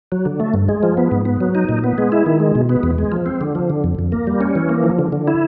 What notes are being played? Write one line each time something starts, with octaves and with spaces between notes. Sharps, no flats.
F#3
D3
A3
G2
G#3
F3
B3
G#2
B3
F#3
D#4
A#2
B3
G#3
E4
D#3
G#3
B2
B3
E2
G#3
F3
C4
D3
F3
D3
F2
F2
A#3
G3
C#4
E3
A#3
F3
D3
D3
E4